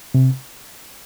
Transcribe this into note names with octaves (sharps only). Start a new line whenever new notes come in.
C3